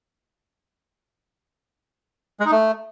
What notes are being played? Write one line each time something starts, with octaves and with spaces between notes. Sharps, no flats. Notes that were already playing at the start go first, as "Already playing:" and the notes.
G#3
D#4
A3